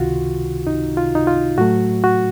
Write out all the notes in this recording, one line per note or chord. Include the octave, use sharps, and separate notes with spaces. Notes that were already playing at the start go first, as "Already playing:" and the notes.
Already playing: C#2 C3 D#3 F4 F#4
D#4
F4
D#4
F4
A2 F#3 A3 F#4
F#4